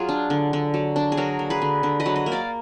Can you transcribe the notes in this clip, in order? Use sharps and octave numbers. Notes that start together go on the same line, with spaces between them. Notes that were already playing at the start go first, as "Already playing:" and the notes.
Already playing: F#3 F4 G#4
D4
D3
D3
F#3
D4
G#4
F#3 F#4 A#4
A#3
G#4 B4
D3
D3
B4 D#5
F#3
B4 D#5
A#3
D5 F5